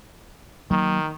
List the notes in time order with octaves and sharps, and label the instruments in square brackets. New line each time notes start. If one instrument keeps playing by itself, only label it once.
[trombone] D#3 [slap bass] F#3 A#3